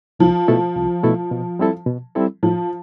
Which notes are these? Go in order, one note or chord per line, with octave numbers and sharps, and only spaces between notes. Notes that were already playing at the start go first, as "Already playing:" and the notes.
C2 F3
B2 A3 E4 A4
C2
B2 A3 E4 A4
B2
G3 C4 E4 A4
B2
G3 C4 E4 A4
A2 F3